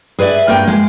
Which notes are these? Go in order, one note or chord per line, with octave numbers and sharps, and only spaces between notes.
G#4 B4 C#5 D5 E5
G2 A#3 G5
G#3